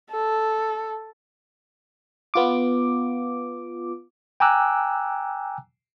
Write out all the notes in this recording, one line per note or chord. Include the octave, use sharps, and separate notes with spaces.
A4
B3 F4 D6
G5 G#5 A#5 D6 E6 F#6